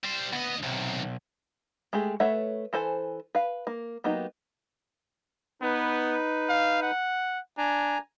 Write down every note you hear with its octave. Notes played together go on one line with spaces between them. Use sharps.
G3 C5
D2 B3 D#5
B1 C3 D#3
G#3 A3 G4 G#4
A3 B4 C#5 E5 F#5
E3 A4 C5 G#5
B4 F5
A#3
F#3 A#3 B3 D#4 G4
B3 D#4 B4
F5
F#5
D4 G#5 A#5